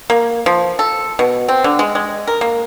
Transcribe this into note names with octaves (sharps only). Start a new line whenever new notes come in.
A#3
F3
A4
B2
C4
D3
G#3
G#3
A#4
A#3